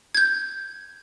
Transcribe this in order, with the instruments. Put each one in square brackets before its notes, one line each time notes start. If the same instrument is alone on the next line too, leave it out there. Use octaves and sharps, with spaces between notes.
[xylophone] G6 G#6